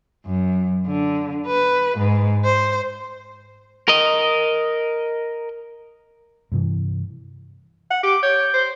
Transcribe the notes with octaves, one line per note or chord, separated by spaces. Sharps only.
F#2
D3
B4
G#2
C5
A#4 D#5
G2 C3 E3
F#5
G4 D6
C#5 G6
C5